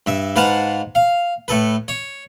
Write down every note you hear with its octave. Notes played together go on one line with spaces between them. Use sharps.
G2 E5
G#2 B4 F5 F#5 A5
F5
A2 A4 B4
C#5